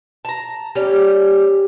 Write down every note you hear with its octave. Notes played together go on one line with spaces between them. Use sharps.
A5 A#5
G3 C#4 G4